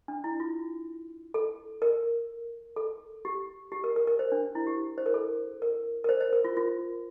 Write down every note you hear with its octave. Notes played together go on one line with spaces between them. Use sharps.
D4
E4
F4
A4
A#4
A4
G4
G4
A#4
A#4
A#4
C5
D4
E4
G4
C5
A#4
A4
A#4
A#4
C5
C5
A#4
F4
F4